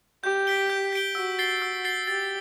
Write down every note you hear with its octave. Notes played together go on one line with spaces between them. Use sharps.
G4 G6
B6 D7 G7
G6
B6 D7 G7
F#4 E6
A6 C7 G7
E6
A6 C7 G7
G4 A6